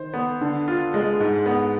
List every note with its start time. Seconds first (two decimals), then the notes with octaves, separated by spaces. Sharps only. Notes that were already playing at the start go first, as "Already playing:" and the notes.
Already playing: D#3 C5
0.14 B3
0.41 D3
0.68 F4
0.94 G#3
1.20 G#2
1.46 B3